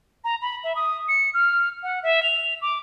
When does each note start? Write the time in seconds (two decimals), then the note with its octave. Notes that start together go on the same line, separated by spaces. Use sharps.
0.24 A#5
0.42 B5
0.64 E5
0.75 D#6
1.09 C#7
1.34 F6
1.83 F#5
2.03 E5
2.23 F7
2.62 D6